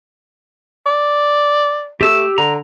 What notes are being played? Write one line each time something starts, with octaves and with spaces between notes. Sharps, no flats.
D5
A3 G4 E6
D3 A#5